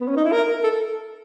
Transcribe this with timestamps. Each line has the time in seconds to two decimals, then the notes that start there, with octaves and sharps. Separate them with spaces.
0.01 B3
0.08 C#4
0.16 D#4
0.25 E4
0.32 A#4
0.64 A4